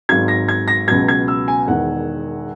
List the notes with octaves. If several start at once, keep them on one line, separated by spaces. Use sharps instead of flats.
G#1 G#2 F#3 G#6
A#6
G#6
A#6
C#2 B2 F#3 G#6
G#6
E6
G#5
E1 E2 D#3 F#5